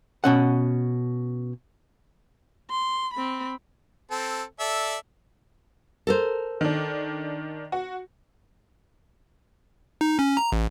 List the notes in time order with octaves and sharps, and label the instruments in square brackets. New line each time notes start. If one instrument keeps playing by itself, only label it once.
[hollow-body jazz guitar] B2 C#4 F#5
[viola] C6
C4 B5
[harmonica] C4 A4
A4 D5 E5
[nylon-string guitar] A4 A#4 C5
[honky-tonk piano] D#3 D4
F#4
[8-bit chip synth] D#4
C#4
A#5
A1